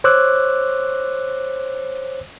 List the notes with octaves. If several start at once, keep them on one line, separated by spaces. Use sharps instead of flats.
C5 C#5 D6 E6 F#6